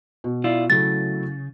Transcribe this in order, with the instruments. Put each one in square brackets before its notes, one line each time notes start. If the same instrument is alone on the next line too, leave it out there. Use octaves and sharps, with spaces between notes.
[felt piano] B2
[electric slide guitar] E4 F4 D5
[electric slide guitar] C#3 [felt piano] F#3 A3 E4 [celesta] A6